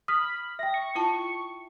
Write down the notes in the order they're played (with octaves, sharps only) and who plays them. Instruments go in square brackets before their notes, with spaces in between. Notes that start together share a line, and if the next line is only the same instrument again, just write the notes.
[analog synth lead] B5 [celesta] D#6 F6
[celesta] E5 G5 [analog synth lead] A#6
[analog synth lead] C#6
[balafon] E4 F4 A5